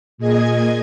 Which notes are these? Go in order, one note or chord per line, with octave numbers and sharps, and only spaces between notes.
A#2 G#4 D#5 G#6